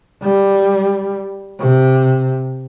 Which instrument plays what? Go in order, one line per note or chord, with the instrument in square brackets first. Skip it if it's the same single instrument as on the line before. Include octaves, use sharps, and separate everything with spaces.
[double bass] G3
C3